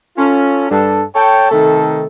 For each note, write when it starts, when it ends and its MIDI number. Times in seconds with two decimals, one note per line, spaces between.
0.17 0.68 61
0.17 0.68 65
0.17 0.68 69
0.70 1.04 43
0.70 1.04 62
0.70 1.04 69
1.15 1.48 69
1.15 1.48 73
1.15 1.48 79
1.51 2.06 48
1.51 2.06 51
1.51 2.06 57
1.51 2.06 69